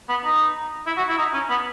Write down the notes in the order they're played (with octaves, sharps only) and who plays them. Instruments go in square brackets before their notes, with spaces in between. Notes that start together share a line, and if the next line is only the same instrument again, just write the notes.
[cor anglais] B3
D#4
E4
F#4
E4
D#4
C#4
B3